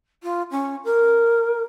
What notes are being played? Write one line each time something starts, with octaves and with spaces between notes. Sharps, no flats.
F4
C#4
A#4